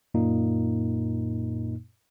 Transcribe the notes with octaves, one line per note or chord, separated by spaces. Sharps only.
F#2 A#2 A#3 D#4